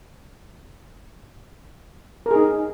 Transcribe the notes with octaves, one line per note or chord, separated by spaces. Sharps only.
D#4 G#4 A#4